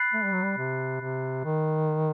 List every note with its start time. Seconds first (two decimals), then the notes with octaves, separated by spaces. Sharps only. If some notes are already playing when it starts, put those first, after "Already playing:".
Already playing: B5 F#6 A6 C7
0.13 A3
0.24 G3
0.33 F#3
0.43 G3
0.58 C3
1.00 C3
1.44 D#3